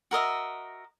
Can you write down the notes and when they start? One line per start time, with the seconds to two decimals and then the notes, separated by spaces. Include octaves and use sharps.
0.11 F#4 A#4 D#5 E5